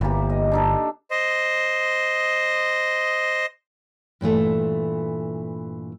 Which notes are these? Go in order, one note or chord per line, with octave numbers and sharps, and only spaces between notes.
G1 E3 A#3 G4
D#5
D4 D#4 A4
C5 D#5
G2 A#2 E3 A3